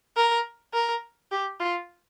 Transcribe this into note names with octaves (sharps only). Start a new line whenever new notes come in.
A#4
A#4
G4
F4